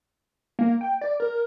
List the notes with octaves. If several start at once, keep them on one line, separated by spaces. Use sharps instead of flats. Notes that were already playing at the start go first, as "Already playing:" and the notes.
A#3
G5
D5
A#4